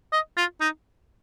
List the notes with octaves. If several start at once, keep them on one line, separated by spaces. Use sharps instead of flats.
D#5
F4
D#4